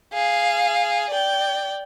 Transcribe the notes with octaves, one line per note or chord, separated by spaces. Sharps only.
G#4 F5
D5 G5